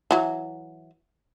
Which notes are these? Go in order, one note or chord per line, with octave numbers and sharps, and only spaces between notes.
E3 F#3